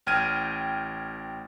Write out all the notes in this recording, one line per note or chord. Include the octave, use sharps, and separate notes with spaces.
A1 G5 F6 G#6 D#7